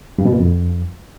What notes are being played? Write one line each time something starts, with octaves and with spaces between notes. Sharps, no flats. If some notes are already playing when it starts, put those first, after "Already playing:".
G2
B2
A#2
F2